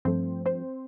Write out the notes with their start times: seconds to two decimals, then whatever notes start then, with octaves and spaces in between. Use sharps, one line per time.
0.05 G2 F3 A3 C4 C5
0.46 C4 C5